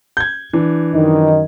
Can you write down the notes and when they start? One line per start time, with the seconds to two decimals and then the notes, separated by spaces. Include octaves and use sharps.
0.17 G6 G#6
0.53 E3 D4
0.93 F#2 D#3 D#4